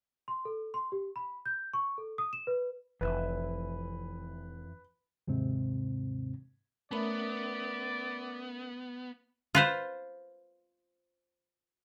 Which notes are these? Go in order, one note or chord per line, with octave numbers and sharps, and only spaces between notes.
C6
A4
C6
G4
B5
G6
C#6
A4
D#6
E7
B4
F1 F2 E3 B4 E5
D#2 G#2 C3 C4
A3 B3 C#4 A#4 D5 E5 B5
F4 B4 C5